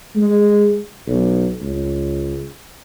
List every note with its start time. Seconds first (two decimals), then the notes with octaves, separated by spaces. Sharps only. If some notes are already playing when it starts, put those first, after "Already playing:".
0.15 G#3
1.07 B1
1.61 C#2